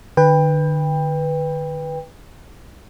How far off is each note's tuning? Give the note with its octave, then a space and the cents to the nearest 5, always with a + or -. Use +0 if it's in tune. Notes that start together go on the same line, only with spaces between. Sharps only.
D3 +45 B4 +0 G5 +25